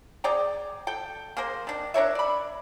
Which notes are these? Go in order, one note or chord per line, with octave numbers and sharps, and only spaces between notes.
G#4 D5 G5 A#5
A4 G5
A#3 G#4 A#4 C5
D#3 D4
D4 A#4 C#5 E5
D5 B5